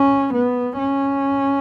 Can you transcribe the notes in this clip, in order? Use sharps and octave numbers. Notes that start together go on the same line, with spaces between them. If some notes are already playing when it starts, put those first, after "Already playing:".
Already playing: C#4
B3
C#4